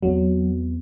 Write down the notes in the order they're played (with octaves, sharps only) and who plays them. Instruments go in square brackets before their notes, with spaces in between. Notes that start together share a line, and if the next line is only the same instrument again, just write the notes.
[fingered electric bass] E2 B3 C4 [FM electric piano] F#3